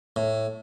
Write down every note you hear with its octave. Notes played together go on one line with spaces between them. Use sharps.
A2